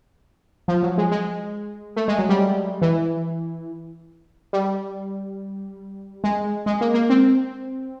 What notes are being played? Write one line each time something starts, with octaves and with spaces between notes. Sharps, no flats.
F3
F#3
G#3
G#3
A3
G#3
F#3
G3
E3
G3
G#3
G#3
A#3
A#3
C4